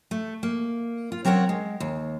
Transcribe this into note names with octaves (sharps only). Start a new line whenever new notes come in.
A3
A#3
F4
F#3 C4 A#4 C#5 F#5
G#3
D#2